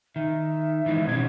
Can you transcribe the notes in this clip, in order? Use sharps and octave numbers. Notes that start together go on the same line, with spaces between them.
D#3 E5
D#3 E3 G#3
B2 C4 C#4 G#6